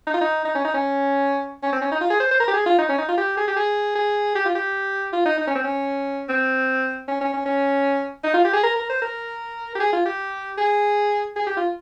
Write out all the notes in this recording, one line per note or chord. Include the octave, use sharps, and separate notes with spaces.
D#4
F4
D#4
D#4
C#4
D#4
C#4
C#4
C4
C#4
D#4
F4
G#4
C5
C5
A#4
G4
G#4
F4
D#4
C#4
D#4
F4
G4
G#4
G4
G#4
G#4
G4
F4
G4
F4
D#4
D#4
C#4
C4
C#4
C4
C#4
C#4
C#4
C#4
D#4
F4
G4
G#4
A#4
A#4
C5
A#4
G4
G#4
F4
G4
G#4
G#4
G4
F4